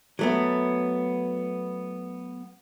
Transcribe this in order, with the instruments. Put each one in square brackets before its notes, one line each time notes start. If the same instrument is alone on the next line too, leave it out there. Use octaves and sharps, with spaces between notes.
[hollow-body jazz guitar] F#3 A3 B3